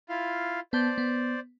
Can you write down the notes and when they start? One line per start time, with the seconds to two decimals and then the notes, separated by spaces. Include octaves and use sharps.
0.09 E4 F4 F5
0.73 B3 C5 D5 A5 G6
0.98 B3